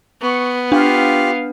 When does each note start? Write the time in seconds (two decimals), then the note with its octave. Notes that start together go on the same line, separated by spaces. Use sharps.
0.21 B3 C#6
0.72 D4 F4 G4 F5